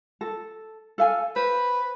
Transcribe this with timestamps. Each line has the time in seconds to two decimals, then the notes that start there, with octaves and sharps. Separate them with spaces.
0.21 A4
0.98 A4 F5 G#5
1.36 B4 C5